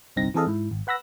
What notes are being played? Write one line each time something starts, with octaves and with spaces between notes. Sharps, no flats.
G1 C2 G2 C4 D#4 A#6
E3 C4 G#4 A4 D#5 F5
G#2 E4
G#1
B4 F#5 B5 E6 A#6